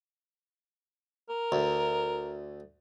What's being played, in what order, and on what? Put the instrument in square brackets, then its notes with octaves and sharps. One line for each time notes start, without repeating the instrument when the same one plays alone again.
[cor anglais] A#4
[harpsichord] D2